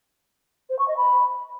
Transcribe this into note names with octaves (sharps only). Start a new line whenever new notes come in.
C5
C#6
D#5
B5